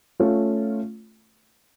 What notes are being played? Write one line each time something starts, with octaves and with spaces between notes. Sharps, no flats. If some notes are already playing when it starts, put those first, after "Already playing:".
A3 C#4 F4